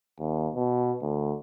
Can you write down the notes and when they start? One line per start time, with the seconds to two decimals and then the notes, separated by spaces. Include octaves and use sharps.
0.20 D#2
0.55 B2
1.02 D2